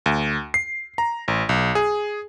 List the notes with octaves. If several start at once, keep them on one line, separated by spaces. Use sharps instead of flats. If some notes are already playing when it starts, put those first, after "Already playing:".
D2
C7
A#5
A1
B1
G#4